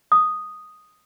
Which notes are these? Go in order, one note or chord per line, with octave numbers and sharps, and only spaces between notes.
D#6